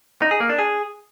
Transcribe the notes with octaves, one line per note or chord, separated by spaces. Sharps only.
D#4
G#4
A#3
D4
G#4